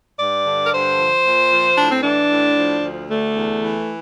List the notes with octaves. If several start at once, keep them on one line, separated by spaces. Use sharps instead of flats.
G2 D5
D3
A#4
G2 C5
F3
A#2
F3
A2 D4
C4
E3 D4
A2
F3
D2
D3 A3
E2
E3